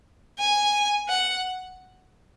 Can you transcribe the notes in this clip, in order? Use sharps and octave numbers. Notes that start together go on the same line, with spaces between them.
G#5
F#5